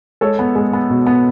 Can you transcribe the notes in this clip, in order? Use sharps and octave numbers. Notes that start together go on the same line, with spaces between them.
G#3 A4 C#5
B3
G#3
B3
B2
B3